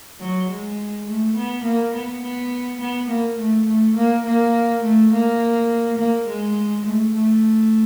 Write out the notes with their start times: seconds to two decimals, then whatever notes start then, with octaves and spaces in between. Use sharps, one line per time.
0.20 F#3
0.49 G#3
1.08 A3
1.36 B3
1.64 A#3
1.94 B3
2.23 B3
2.81 B3
3.10 A#3
3.38 A3
3.67 A3
3.97 A#3
4.26 A#3
4.83 A3
5.12 A#3
5.98 A#3
6.28 G#3
6.86 A3
7.14 A3